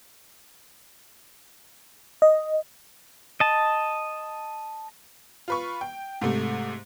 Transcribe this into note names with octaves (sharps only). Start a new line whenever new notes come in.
D#5
D#5 A5
F4 B4 C#6
G5
G#2 C3 A3